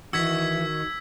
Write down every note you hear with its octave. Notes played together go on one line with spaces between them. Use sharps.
D#3 E3 F#4 E6 G#6 B6